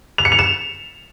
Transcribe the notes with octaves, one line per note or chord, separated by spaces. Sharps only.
F7
C#7
F7
E7